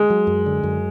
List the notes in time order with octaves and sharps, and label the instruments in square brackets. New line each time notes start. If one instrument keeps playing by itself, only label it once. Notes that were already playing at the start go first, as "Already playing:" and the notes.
Already playing: [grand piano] G#3
[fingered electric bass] F#3
F#2
D3
F#2